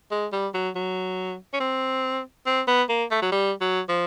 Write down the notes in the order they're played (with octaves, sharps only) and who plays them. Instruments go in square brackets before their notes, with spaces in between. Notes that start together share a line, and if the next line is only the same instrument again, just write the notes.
[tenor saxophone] G#3
G3
F#3
F#3
C#4
C4
C4
B3
A#3
A3
F#3
G3
F#3
F3